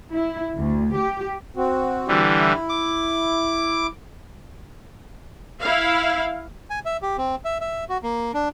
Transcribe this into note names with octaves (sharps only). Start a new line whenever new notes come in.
E4
D2
G4
C4 F#4
D3 E3 G3
E4
D6
E4 F5
G#5
E5
G4
C4
E5
E5
F#4
A#3
D4